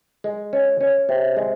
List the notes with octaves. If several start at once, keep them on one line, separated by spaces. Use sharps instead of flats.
G#3
C#4
C#4
C3
G#3